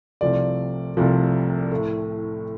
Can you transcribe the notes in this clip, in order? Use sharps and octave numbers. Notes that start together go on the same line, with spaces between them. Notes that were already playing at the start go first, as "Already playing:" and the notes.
C2 C3 F3 A3 D5
C2 C3 F3 A3
A2 A3